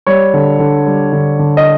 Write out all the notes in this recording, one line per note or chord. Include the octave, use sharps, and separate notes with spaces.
G3 C#5
D3
D3
G3
D3
D3
D#5